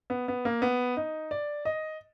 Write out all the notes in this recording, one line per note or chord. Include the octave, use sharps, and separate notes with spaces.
B3
B3
A#3
B3
D#4
D5
D#5